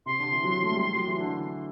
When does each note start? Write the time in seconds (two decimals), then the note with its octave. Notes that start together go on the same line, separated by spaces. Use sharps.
0.06 C3 C6
0.19 D3
0.32 E3
0.44 F#3
0.63 A3
0.73 G3
0.95 F#3
1.08 E3
1.19 D3